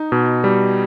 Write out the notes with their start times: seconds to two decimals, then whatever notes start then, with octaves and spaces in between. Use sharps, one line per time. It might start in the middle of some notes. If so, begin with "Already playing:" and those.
Already playing: D#4
0.12 B2
0.44 G3